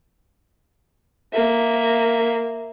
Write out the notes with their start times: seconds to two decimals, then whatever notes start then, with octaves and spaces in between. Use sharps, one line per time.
1.33 A#3 E5